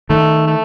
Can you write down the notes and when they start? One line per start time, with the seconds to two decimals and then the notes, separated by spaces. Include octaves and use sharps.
0.09 D#3 A3
0.47 A3